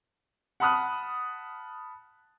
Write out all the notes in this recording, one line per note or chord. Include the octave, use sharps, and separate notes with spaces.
F#5 A5 B5 D#6 F6 F#6